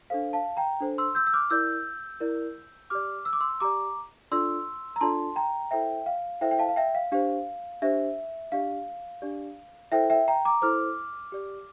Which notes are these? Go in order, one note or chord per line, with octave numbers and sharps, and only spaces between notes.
D4 A4 C5 F5
F5 A5
G5 A#5
D4 A4 C5
C6 E6
E6 G6
E6
D6 F6
E4 A#4 D5 E6 G6
E4 A#4 D5
G4 D5 D6 F6
E6
D6
C6 E6
G4 D5 A#5 D6
D4 F4 A4 D5 C6 E6
A#5
D4 F4 A4 D5 A5 C6
G5 A#5
E4 A4 C5 E5 G5
F5
E4 A4 C5 E5 G5
G5
F5 A5
F5
E5 G5
F5
D4 G4 C5 F5
D4 G4 C5 E5
D4 G4 D5 F5
D4 G4 D5
E4 A4 C5 E5 G5
E5 G5
G5 A#5
A#5 D6
E4 A4 C5 D6 F6
G4 D5